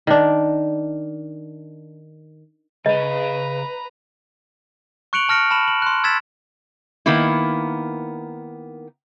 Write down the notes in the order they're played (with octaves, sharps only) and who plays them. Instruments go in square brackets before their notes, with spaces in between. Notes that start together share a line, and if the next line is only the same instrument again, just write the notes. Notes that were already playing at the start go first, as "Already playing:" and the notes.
[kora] D#3 D4
[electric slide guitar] C#3 G#4 [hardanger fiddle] B4 A#5 [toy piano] D#5
[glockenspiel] C#6 F#6 C#7 D7 F7 F#7
A5 F6 A#6 C#7 D7
A5 B5 E7 F#7
F#7
C6 F#6
E6 G#6 A6 B6 E7
[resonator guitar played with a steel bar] D#3 A#3 B3 E4